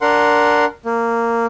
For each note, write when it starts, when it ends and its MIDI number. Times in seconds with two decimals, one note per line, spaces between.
0.01 0.65 62
0.01 0.65 70
0.01 0.65 78
0.01 0.65 84
0.85 1.46 58